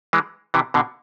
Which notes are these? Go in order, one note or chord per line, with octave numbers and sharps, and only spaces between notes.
E3 G#3
C3 E3
B2 D3